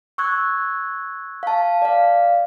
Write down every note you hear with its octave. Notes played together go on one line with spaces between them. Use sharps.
C#6 E6 F#6 G#6
F5 A5
D5 F5